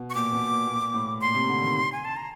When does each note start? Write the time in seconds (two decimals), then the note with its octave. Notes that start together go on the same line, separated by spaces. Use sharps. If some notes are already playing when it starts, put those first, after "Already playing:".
Already playing: B2
0.10 C#6
0.15 A#2 D6
0.33 B2
0.51 A#2
0.67 A#2
0.94 A2
1.21 A#2 C6
1.34 C3
1.49 D3
1.62 D#3
1.92 G#5
2.05 A5
2.16 A#5